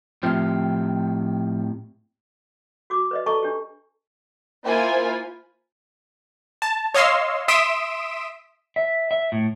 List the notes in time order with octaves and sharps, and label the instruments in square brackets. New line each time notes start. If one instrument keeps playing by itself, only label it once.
[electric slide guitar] A2 C4 G4 [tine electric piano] F3 E5 F6
[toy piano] F#4 D6
B4 D5 D#5
A4 D#5 A5 A#5 C#6
D4 G4
[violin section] A#3 E4 F4 C5 G#5 B5
[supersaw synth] A5
C#5 D#5 F5 C6 E6
E5 C6 D#6 B6 D7 E7
[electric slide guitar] E5
E5
A2